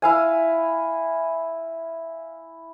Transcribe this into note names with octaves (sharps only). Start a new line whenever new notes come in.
E4 F5 G#5